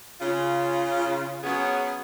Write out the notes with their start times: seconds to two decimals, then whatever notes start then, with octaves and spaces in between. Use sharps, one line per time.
0.20 C#3 F4
1.42 F#3 B3 C#4 G#4